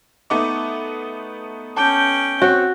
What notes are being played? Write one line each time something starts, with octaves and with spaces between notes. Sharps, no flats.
A3 B3 D#4 D6
C#4 G5 A5 D6 G6
C4 F#4 C#5